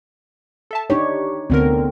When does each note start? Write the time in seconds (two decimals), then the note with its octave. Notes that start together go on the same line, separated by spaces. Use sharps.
0.71 A4 E5 A5
0.90 D4 D#4 G4 C#5
1.50 D2 D3 B3 C4 A#4